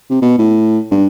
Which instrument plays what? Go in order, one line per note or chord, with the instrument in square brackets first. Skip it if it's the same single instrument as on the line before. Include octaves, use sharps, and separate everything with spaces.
[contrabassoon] C3
B2
A2
G2